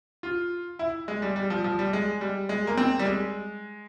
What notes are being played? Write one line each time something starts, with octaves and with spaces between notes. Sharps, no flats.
F4
E4
G#3
G3
G3
F3
F3
G3
G#3
G3
G#3
A#3
C4
G3
G#3